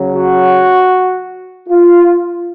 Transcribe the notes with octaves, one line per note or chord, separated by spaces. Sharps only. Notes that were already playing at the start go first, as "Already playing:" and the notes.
Already playing: C#3 F#3
F#4
F4